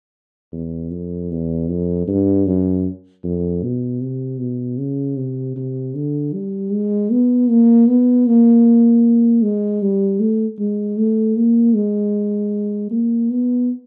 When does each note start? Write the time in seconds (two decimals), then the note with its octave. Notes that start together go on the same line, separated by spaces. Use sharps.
0.52 E2
0.91 F2
1.31 E2
1.68 F2
2.07 G2
2.46 F#2
3.24 F2
3.63 B2
4.01 C3
4.40 B2
4.78 C#3
5.17 C3
5.56 C3
5.95 D3
6.33 G3
6.72 G#3
7.11 B3
7.49 A#3
7.88 B3
8.27 A#3
9.42 G#3
9.82 G3
10.20 A3
10.59 G#3
10.98 A3
11.37 A#3
11.75 G#3
12.91 A#3
13.30 B3